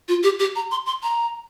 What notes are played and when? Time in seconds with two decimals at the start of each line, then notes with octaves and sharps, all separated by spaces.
0.08 F4
0.23 G4
0.40 G4
0.55 A#5
0.71 C6
0.86 C6
1.03 A#5